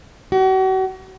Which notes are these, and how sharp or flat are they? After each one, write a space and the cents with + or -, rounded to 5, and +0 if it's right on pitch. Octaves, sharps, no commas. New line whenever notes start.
F#4 +40